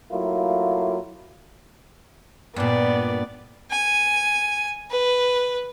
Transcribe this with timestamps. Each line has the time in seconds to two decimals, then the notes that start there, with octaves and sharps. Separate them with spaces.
0.11 F#3 A3 A#3 E4 F4
2.56 G2 A#2 B3 D5
3.71 G#5
4.90 B4